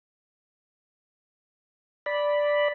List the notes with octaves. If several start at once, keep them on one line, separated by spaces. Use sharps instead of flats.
D5 B5